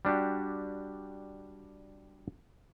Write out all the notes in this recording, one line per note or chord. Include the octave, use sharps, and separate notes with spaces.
G3 D4 F#4 G4